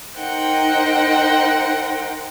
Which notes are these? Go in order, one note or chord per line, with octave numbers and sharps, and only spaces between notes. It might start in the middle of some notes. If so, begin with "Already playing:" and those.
D#4 A#4 C5 F#5 G5